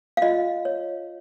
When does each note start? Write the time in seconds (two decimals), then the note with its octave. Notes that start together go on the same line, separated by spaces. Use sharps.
0.17 F5
0.22 F4 D#5
0.65 C#5